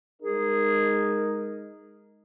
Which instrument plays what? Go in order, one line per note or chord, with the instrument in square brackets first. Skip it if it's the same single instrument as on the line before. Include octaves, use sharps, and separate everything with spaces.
[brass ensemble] G#3 D#4 A#4 [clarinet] G#4